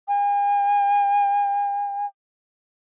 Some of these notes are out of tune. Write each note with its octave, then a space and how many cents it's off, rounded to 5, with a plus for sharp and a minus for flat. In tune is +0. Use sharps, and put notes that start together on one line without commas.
G#5 -40